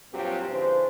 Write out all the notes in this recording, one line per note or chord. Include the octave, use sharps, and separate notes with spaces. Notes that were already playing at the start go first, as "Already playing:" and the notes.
G2 A#2 F#3 C4 F4 G4
C#3 E3 D4 C5